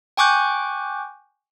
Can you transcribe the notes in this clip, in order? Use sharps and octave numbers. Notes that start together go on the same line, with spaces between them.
G5 G#5 C#6 D6 F#6 G6